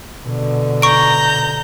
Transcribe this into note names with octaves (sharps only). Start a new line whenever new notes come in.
B2 D3
A#5 C#6 G6 D7